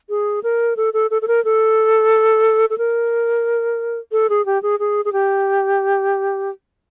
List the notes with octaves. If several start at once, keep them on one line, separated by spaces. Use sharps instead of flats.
G#4
A#4
A4
A4
A4
A4
A#4
A4
A4
A#4
A4
G#4
G4
G#4
G#4
G#4
G4